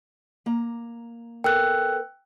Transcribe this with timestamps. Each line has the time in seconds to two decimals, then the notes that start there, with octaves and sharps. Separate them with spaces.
0.46 A#3 A#5
1.44 B3 A4 A#4 G5 E6 F#6